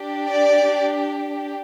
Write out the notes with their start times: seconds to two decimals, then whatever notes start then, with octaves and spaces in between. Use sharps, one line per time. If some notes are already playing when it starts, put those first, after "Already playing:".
Already playing: D4 G4
0.31 D5